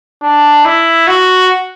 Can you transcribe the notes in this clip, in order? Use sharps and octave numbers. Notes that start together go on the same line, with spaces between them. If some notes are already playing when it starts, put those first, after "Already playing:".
D4
E4
F#4